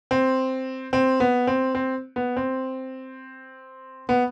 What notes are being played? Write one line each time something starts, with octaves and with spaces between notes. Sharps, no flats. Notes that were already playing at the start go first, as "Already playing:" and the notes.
C4
C4
B3
C4
C4
B3
C4
B3